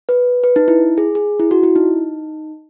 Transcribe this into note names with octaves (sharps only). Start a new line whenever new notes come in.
B4
B4
D#4
E4
G#4
G#4
E4
F#4
E4
D#4